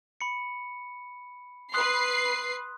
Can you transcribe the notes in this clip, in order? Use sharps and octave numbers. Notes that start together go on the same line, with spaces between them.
B5 C#7
B4 C6 D#6 F#6 C7